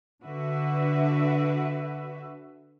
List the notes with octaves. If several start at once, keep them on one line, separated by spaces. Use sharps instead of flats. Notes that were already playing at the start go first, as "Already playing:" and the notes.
D3 F#4 B4 E5